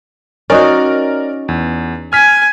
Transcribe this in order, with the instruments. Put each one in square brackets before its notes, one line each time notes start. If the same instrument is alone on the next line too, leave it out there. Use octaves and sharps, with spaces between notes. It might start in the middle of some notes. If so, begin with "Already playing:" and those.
[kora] C#4 D#4 F#4 [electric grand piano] A#4 D5
[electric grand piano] E2
[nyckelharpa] G#5 [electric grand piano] F6 B6